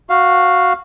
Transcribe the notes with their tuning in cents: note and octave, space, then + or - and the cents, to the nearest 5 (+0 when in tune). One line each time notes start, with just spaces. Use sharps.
F#4 -10 F5 +0